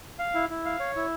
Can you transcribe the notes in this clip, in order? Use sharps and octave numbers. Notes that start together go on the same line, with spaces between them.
F5
E4
E4
F5
C#5
E4